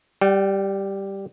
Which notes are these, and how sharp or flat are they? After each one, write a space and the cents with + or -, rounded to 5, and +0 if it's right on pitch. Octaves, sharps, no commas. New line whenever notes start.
G3 +0 G5 -40